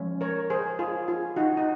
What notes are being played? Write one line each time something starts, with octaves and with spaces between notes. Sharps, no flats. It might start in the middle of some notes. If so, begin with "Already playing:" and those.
Already playing: F3 G#3 C#4
A#4 C#5
G#4 C5
F4 G#4
F4 G#4
D#4 F#4
D#4